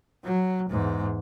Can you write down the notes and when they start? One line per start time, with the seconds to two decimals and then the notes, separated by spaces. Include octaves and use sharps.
0.25 F#3
0.70 E2 G#2